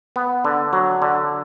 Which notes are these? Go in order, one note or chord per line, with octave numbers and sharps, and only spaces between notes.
B3
D3
F#3
D3